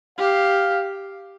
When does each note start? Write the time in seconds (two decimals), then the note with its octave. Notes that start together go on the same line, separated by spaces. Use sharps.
0.18 G4 F5